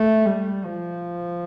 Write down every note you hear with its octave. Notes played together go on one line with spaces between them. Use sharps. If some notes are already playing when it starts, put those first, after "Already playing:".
Already playing: A3
G3
F3